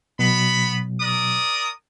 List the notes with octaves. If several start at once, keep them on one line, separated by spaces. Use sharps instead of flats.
B2 F#3 B3 B5
A#4 D5 D#6